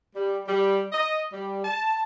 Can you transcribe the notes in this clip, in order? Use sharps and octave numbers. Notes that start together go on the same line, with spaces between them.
G3
G3
D#5
G3
A5